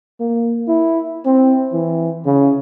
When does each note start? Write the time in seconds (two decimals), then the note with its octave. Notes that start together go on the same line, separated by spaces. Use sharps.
0.20 A#3
0.68 E4
1.25 C4
1.73 E3
2.26 C#3